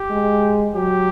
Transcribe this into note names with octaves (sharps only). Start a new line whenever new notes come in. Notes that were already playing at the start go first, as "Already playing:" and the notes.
Already playing: G4
G#3
F#3 G4